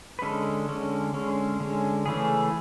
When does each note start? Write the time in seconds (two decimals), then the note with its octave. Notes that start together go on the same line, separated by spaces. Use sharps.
0.19 B4
0.22 D3 G#3 C#4 A4
0.69 D3 G#3 C#4
1.14 D3 G#3 C#4
1.60 D3 G#3 C#4
2.06 C#3 E3 A3 C#4 G#4